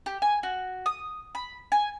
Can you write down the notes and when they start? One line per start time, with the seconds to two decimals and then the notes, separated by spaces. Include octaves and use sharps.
0.06 G4
0.22 G#5
0.43 F#4
0.86 D#6
1.35 B5
1.72 G#5